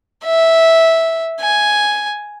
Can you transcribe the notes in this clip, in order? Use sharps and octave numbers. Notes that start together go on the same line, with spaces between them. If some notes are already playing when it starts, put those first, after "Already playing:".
E5
G#5